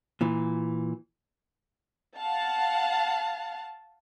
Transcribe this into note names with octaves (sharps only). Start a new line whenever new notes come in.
A#2 E3
F5 F#5 A5